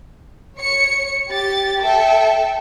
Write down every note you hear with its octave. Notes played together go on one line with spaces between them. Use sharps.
C#5 C#7
G4 A6
A4 E5 G5